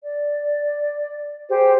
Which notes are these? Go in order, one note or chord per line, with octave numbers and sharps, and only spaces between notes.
D5
G4 G#4 C5